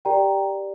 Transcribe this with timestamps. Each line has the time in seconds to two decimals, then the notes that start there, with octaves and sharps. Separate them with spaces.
0.05 G4 A#4 D5 G5 A#5